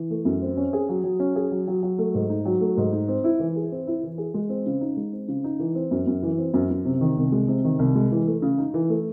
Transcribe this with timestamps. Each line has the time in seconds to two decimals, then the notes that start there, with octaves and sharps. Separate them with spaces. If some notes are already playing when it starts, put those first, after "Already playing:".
Already playing: E3
0.11 A3
0.25 F#2
0.42 C4
0.57 C#4
0.73 G#4
0.89 F#3
1.04 F#3
1.20 C#4
1.36 G#4
1.51 F#3
1.68 F#3
1.83 F#3
1.98 A3
2.14 G#2
2.30 D#4
2.45 F#3
2.61 A3
2.77 G#2
2.92 D#4
3.08 C4
3.24 E4
3.39 E3
3.56 G#4
3.72 C4
3.87 E4
4.03 E3
4.18 G#4
4.34 G#3
4.49 C4
4.66 C#3
4.81 D#4
4.97 G#3
5.12 C4
5.28 C#3
5.44 D#4
5.59 E3
5.75 C4
5.91 F#2
6.07 F#2
6.23 E3
6.38 C4
6.54 F#2
6.70 F#2
6.85 C3
7.01 D#3
7.17 C2
7.32 G#3
7.48 C3
7.64 D#3
7.79 C2
7.95 G#3
8.12 E3
8.27 A3
8.42 C#3
8.58 D#4
8.74 E3
8.90 A3